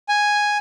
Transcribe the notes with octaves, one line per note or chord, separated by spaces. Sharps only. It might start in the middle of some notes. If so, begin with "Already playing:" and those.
G#5